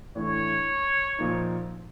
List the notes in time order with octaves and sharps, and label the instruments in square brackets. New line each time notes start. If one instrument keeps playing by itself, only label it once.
[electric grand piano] A2 E3 A3 D4 [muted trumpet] C#5
[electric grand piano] A#2 F3 A#3 D#4